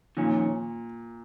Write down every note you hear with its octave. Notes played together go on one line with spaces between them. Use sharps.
F2 A#2 D#3 C#4